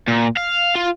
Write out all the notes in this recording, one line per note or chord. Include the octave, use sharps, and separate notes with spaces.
A#2
F5
F4